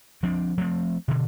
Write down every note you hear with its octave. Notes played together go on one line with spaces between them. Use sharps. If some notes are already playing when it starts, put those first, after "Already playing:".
F3 C4 D4
F3 A3 B3 C4
B2 D3